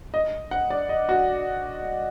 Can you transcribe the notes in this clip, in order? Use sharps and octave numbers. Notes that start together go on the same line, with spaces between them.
D#5
F#5
D5
D#5
F#4